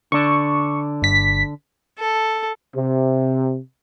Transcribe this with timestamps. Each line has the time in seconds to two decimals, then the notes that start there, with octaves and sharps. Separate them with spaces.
0.12 D3 D4 C#6
1.02 G1 B6
1.99 A4
2.75 C3